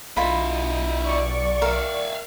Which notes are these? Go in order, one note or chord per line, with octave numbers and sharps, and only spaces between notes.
B1 E4 F4 D#5 B5
D5 C#6
A#4 E5 F5